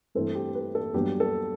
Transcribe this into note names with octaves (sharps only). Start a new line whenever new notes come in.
G2 E3 A3 C4 A4
G4
B4
A4
G2 F#3 B3 G4
A4